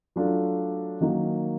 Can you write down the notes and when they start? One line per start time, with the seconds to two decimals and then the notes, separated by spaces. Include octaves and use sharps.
0.16 F#3 A3 D4 F4
1.01 D#3 F#3 A#3 D#4